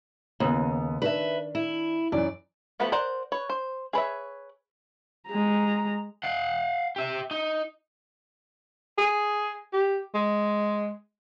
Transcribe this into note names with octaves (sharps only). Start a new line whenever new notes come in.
D#2 C#3 B3 D#6
D#3 D4 B4 E5
E4
F#2 E3 D5
F3 A3 B3 F#4 B4
A#4 C5 D5 F#5
B4 C#5
C5
G#4 B4 C#5 E5
G#3 A#5
F5 F#5
G4 E5
D#4
G#4
G4
G#3